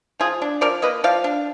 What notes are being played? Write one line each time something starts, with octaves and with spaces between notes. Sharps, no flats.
F3 F4 G#4
D4
F3 A#4 D5
A#3 B4 D#5
F3 D5 F5
D4